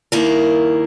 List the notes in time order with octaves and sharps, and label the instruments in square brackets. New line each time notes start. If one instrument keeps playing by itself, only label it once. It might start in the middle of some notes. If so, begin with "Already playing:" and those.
[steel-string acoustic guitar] D#2 D#3 A#3 E4 A#4